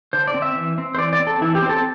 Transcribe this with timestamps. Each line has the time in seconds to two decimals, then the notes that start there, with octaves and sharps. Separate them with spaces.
0.13 D3 C5
0.27 D5
0.34 C4
0.42 E5
0.55 E3
0.78 C4
0.95 C5
0.98 E3 D5
1.13 D5
1.20 C4
1.27 A4
1.41 E3 E4
1.55 G4
1.62 C4 C5
1.69 A4